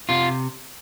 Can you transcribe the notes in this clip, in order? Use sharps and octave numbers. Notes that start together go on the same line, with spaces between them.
C3 F4